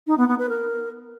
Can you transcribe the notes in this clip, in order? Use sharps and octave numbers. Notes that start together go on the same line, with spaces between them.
D#4
B3
B3
B4
A#4